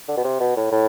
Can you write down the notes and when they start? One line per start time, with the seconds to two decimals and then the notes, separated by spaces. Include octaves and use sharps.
0.08 D3
0.17 B2
0.24 C3
0.40 B2
0.56 A2
0.71 A2